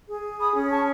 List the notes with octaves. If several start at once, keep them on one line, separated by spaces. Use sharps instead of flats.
G#4
B5 D#6
C#4
A5 C#6